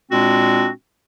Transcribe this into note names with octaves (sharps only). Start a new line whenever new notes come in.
A#2 G#3 C4 D4 F#4